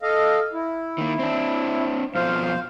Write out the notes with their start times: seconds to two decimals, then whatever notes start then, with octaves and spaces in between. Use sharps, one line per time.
0.02 A4 D#5 F5
0.53 E4
0.98 D#3 A#3
1.19 C4 D4
2.15 F2 B2 F4 C5 F5